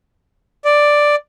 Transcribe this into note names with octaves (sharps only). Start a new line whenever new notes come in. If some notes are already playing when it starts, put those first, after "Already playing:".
D5